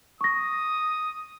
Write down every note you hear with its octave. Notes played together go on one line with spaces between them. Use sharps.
C#6 D#6 A#6